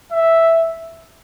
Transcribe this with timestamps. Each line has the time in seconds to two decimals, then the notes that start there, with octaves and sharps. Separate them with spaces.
0.10 E5